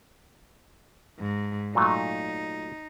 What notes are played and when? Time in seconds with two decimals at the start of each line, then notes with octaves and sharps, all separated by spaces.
1.19 G#2
1.75 A#2 F#3 A3 D#4